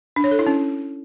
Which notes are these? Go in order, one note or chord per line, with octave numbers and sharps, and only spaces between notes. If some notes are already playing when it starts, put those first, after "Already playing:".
D4
C#5
A4
E4
C#4